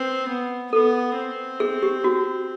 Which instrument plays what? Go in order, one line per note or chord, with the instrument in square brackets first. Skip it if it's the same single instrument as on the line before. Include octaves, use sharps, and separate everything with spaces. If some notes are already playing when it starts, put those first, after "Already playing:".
Already playing: [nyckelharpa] C4 [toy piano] B4
[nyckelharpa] B3
[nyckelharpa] B3 [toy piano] A4
[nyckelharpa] C4
[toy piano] G#4
G4
F#4